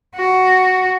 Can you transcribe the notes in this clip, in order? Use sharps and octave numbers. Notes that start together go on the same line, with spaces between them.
F#4